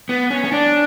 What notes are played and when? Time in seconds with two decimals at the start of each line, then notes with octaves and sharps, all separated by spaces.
0.09 B3
0.31 C#4
0.45 C#4
0.52 D4